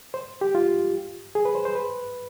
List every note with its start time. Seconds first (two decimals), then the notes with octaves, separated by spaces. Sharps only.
0.14 C5
0.41 G4
0.55 F4
1.35 G#4
1.45 B4
1.55 C5
1.65 C5
1.75 B4